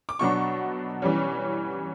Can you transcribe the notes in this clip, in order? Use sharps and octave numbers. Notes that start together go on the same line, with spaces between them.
D6
B2 F#3 B3 D4 C#6
E3 G3 C#4